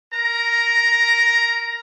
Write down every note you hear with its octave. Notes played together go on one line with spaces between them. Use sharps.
A#4 A#5